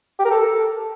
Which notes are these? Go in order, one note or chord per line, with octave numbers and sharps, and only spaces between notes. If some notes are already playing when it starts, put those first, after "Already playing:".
G4
A#4
A4